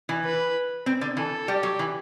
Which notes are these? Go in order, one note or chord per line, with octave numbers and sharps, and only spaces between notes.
E3
B4
C4
D3
E3 A4
G3 G4
F#3
E3